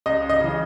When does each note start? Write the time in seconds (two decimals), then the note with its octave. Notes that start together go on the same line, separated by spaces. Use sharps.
0.06 C#2 D#5
0.29 D#5
0.40 C#3 E3